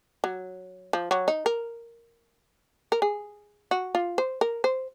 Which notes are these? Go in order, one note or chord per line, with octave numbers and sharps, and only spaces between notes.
F#3
F3
F#3
D#4
A#4
A#4
G#4
F#4
F4
C5
A#4
C5